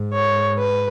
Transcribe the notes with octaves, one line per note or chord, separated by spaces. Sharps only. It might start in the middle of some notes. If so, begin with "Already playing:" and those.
Already playing: G#2
C#5
B4